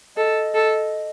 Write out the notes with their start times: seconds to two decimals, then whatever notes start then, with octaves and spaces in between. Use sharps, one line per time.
0.17 A4 D#5
0.55 A4